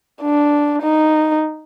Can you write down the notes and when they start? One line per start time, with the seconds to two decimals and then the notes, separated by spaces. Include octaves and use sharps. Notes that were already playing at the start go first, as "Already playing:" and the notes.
0.22 D4
0.82 D#4